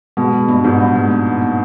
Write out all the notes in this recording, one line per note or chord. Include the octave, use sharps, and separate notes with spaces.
B2 G#3
G#3
G2 B3
G#2 F3
G2 A#2
G#3
B3
A#2
B3